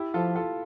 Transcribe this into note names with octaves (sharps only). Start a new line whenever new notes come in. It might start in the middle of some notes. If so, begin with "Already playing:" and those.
Already playing: E4 G4
F3 F4 A4
F4 A4